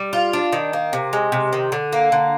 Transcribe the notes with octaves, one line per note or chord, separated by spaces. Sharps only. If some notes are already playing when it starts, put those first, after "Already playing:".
Already playing: G3
F4
D4
D#3
A#3
C3
G#3
C3
D#3
D3
A#3
D3